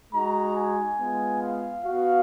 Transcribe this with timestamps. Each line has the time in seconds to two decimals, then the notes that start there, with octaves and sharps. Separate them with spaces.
0.12 G#3 D#4 F#4 A#5
0.54 G#5
0.97 G#3 B3 F4
1.41 F5
1.84 B3 F#4 F5